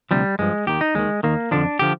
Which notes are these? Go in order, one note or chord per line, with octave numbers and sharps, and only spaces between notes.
D2 C3 F3 G3
G2 F3 G#3
D#2 D#3 G4
D#4
D#2 D#3 G#3
D#2 D#3 A#3
F2 D3 F3 D4
D3 F3 G4